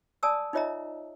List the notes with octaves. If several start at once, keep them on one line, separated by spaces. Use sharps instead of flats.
D5 G#5 A5 D#6 E6
D#4 F4 C#5 D#5 E5 A#5